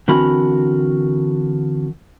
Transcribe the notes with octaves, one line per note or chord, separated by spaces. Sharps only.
D3 E3 C4 F#4 A#4 B5